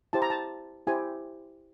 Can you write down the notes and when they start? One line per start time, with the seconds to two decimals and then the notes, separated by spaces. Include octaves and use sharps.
0.13 E4 G4 C5 A5
0.22 A#5
0.30 A5
0.87 E4 G4 C5 G#5